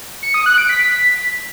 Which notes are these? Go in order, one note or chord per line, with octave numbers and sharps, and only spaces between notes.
C#7
D#6
F#6
D7
B6